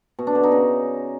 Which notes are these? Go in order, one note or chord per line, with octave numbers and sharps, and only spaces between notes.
B2
D4
D3
D#4
C#3